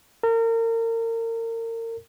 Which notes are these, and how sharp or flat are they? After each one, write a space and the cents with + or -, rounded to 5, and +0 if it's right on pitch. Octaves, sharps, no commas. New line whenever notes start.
A#4 -35